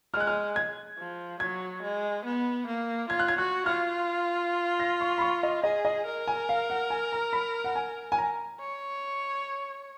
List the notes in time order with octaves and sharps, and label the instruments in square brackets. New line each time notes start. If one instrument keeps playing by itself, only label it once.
[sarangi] G#3 [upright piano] F6
[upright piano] F#6
F6
G#6
[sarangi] F3
[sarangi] F#3 [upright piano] G#6
[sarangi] G#3
B3
A#3
[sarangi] F4 [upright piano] G#6
[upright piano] F#6
G#6
[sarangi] F#4 [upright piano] F#6
[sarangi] F4 [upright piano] F6
[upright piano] A#6
C#6
B5
C#6
D#5
[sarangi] G#4 [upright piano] D#5
[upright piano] D#5
[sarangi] A#4
[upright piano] G#5
F5
F#5
G#5
A#5
B5
F#5
G#5
G#5
A#5
[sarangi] C#5